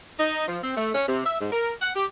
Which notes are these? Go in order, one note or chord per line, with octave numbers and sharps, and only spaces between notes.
D#4
F3
C4
A3
C#4
C3
E5
G#2
A#4
F#5
G4